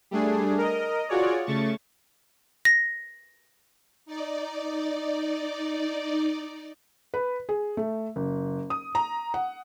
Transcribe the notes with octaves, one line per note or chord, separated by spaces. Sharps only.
G3 A3 D4 G#4
A#4 D#5
F4 F#4 G#4 C#5 D5
C#3 A3 C#6 A6
A#6
D#4 D5
B4
G#4
A3
F#1
D#6
A#5
F#5